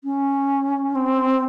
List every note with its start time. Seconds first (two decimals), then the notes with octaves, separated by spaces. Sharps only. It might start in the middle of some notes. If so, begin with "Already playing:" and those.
0.04 C#4
0.95 C4